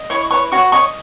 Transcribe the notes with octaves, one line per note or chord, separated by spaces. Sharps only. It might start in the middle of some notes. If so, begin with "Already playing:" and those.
Already playing: D#5
E4 C#5 C#6
B4 C#5 C#6
F#4 C#5 C#6
C#5 D#5 C#6